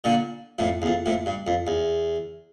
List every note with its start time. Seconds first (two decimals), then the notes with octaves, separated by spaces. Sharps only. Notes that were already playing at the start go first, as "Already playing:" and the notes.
0.04 A#2 D3
0.59 F2 A2
0.82 E2
0.86 F2
1.06 F2 A2
1.26 G2
1.47 F2
1.67 E2